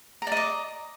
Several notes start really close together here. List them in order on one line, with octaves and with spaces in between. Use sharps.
A#5 D5 D#5 D6